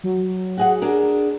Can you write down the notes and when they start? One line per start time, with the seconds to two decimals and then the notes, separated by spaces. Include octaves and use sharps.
0.04 F#3
0.57 F#4 G#4 F#5
0.82 D4 G#4 A#4